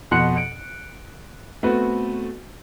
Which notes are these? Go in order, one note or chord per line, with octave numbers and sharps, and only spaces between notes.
F2 B2 F#5 C6 F#6 C#7
C#7 D7
A3 B3 C4 F#4 B4